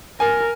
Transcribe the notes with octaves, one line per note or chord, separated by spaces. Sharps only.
A#4 G#5